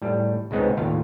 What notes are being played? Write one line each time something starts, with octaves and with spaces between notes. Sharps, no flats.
A2 G3
C#2 C#3 G#3 B3 C4 D#4
D#2 A2 F4 F5